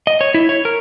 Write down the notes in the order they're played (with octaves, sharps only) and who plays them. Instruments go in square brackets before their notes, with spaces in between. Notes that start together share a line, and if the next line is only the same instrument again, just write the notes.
[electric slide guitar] D#5
C#5
E4
C#5
A#4